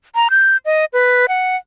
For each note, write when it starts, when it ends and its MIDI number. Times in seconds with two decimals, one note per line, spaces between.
0.15 0.28 82
0.30 0.57 91
0.66 0.85 75
0.93 1.26 71
1.29 1.56 78